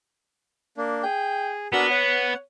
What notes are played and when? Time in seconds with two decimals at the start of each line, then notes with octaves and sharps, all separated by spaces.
0.77 A#3 D4
1.04 G#4 G5
1.73 B3 D4 F#4 A#4 E6
1.90 C#5 F#5